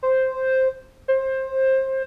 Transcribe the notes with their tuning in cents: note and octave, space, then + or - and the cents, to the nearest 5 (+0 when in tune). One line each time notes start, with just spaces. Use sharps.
C5 +0
C5 +20